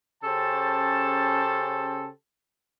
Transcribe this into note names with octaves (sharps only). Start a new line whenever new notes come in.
C#3 C#4 G4 A4 C5 A5